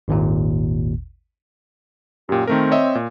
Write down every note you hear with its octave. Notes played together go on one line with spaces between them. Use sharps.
G#1 D#2 A#2
F#2 A#2 G4
D#3 A3 C4 A#4
C#5 D#5 E5
A#2